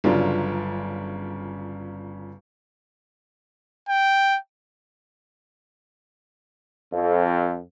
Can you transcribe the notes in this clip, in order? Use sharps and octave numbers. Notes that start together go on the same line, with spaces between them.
G1 C#3 F#3 D4 F4
G5
F2